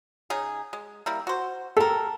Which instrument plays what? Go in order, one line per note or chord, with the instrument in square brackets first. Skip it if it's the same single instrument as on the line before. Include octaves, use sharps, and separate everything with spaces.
[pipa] C#3 D#4 G#4
G#3
G3 A#3 E4
F#4 C5
[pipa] G4 A#4 [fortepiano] A4